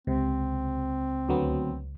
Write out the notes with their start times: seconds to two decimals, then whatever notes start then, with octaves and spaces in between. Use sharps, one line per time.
0.07 C#2 C3 C4
1.29 D2 F#3 B3